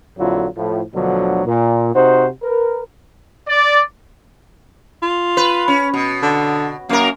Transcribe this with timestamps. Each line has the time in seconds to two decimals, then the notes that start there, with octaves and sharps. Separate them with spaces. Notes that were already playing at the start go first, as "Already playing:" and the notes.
0.18 A#1 F2 D3 F#3 E4 F4
0.56 A2 F3
0.95 D2 B2 D3 F3 F#3
1.46 A#2
1.95 C3 D#4 F#4 C5
2.43 A#4 B4
3.47 D5
5.02 F4
5.37 B4
5.68 C#4
5.94 B2
6.22 D3
6.89 F#2 A#3 A#4